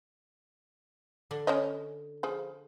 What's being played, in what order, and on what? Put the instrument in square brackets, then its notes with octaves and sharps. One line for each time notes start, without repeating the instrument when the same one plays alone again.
[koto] D3 D4
[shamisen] C#4 C#5 D#5
F3 G#4